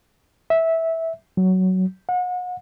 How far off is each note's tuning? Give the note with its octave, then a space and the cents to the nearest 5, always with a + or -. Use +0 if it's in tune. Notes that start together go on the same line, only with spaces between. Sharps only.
E5 -15
F#3 +10
F#5 -35